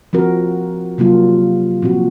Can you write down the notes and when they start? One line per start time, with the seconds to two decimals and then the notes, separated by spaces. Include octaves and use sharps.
0.13 F3 C4 F#4 A#4
0.98 C3 F#3 A#3 F4
1.82 A#2 F3 C4 F#4